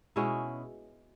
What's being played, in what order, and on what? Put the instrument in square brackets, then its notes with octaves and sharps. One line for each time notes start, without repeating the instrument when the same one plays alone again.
[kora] B2 G#3 C#4 E4